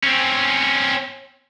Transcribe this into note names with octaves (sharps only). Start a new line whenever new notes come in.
C4 C#4